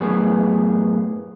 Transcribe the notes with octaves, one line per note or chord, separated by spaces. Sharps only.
F#2 A2 B3 G#4